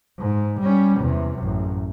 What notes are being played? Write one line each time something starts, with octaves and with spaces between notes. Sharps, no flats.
G#2
G3 C#4
E2 C3
A1 F#2